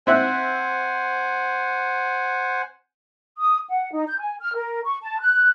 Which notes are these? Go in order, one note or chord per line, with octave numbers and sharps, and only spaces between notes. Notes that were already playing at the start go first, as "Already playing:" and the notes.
C4 C5 E5 F#5 G#5 F#6
D#6
F#5
D#4
G6
G#5
F6
A#4
C#6
A5
F#6